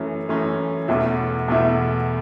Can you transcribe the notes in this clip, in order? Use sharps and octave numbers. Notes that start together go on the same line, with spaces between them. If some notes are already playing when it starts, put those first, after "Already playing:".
Already playing: F#2 E3 A3 C#4
F#2 E3 A3 C#4
E2 B2 A3 E4
E2 B2 A3 E4